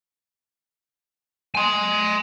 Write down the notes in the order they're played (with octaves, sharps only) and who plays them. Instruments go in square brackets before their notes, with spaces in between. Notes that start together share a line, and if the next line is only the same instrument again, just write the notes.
[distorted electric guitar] G#5 C6